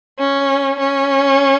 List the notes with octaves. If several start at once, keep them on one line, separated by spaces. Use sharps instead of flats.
C#4
C#4